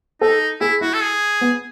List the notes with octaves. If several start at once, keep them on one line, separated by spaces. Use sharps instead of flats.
D#4 A4
E4 G#4
E4 F#4
A4
G#4
B3